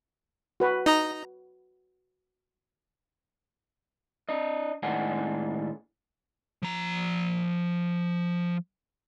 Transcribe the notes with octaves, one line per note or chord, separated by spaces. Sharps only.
F#4 B4
D#4 D#5 A#5
D4 D#5
D#2 A2 G#3 D4 F#5 G#5
F3 A#5